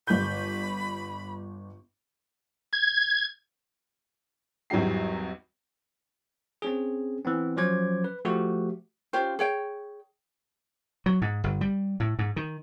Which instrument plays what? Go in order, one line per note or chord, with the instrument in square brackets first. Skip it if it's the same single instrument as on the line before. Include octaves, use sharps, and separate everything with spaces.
[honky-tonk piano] G1 G6 [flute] B5
[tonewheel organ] G#6
[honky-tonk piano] G#1 E2 F#3 G3 G4 C7
[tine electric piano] C4 C#4 G#4
E3 B3 C4
F3 F#3 C#4 C5 D6 G#6
B4
F3 A3 F#4 G4
[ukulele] C#4 F4 G4 C5
G#4 C#5 G5
[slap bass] F#3
G#2
G1
G3
A2
G#2
D#3